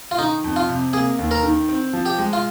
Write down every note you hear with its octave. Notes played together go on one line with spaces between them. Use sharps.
F4
D#3 D#4
F2
F4
C3
A#3 G#4
D#2
A#4
D#3
C4
F3
G4
G#3
F4